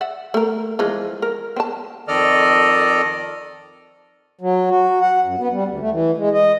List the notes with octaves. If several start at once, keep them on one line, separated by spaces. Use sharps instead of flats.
D5 E5 F#5
A3 A#4
E3 F3 G#3
A#4
C4 A5
F2 D#3 A4 D5 D#5 F6
F#3
F#4
F#5
F#2
B3
G3
D2
A3
E3
G#3
D#5